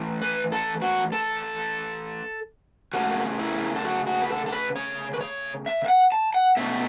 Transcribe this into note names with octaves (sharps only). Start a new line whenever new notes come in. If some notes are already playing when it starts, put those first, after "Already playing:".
Already playing: E3 A3 C#4
B4
A4
F#4
A4
C#3 A3 C#4 F#4
E4
A4
F#4
F#4
B4
A4
A4
B4
C#5
B4
C#5
E5
E5
F#5
A5
F#5
B2 A3 C#4 E5